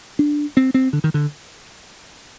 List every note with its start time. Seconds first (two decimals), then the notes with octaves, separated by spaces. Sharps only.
0.19 D4
0.57 C4
0.74 C4
0.93 D3
1.04 D#3
1.14 D3